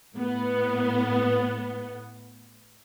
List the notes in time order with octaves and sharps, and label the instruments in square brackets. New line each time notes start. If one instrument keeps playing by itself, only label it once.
[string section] A2 B3